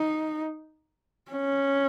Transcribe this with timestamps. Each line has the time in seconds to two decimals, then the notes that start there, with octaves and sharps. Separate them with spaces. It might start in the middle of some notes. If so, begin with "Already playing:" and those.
Already playing: D#4
1.32 C#4